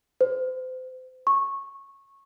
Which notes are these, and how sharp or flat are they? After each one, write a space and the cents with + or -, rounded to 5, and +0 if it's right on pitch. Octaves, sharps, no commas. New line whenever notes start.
C5 -35
C#6 -15